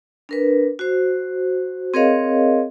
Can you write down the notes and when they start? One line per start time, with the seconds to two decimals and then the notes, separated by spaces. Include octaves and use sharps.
0.29 D4 A#4 B4
0.79 F#4 C5
1.94 C4 G#4 A#4 C#5 D#5 F5